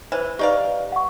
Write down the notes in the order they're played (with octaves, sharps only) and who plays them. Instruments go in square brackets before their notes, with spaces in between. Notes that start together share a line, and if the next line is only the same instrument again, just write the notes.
[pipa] E3 [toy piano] B4 C5
[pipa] D#4 D5 F5 [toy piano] G4 B4
[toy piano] F#5 C#6